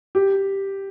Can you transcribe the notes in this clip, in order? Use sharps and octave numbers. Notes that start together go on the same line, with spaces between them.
G4